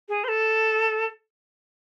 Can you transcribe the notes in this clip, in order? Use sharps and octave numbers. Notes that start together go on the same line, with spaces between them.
G#4
C5
A4